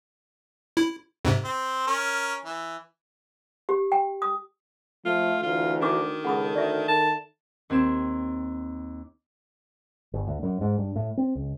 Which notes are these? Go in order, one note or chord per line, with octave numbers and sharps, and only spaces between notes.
E4
F2 G#2 C3
C4
C#4 A#4
E3
G4
G5
D#6
F3 A3 F4
D2 E3 F4
D#3 D4 F#4 D6
C#2 A4 F#5 B5 D#6
D2 D5 E5
D#3 A5
D#2 C4 G#6 E7
G1
D2
F#2
G#2
G2
A2
C4
C#2